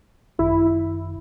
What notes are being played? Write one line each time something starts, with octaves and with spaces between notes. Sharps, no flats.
G#1 F#2 D#3 E4